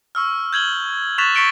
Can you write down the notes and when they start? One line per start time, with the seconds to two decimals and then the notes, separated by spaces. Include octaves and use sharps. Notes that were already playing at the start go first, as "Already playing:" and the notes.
0.15 C#6 E6 F6
0.53 G6 G#6 F#7 G7
1.18 C#6 F#6 A6 B6 E7 F7
1.35 C#6 A6 B6 C#7 D7 G7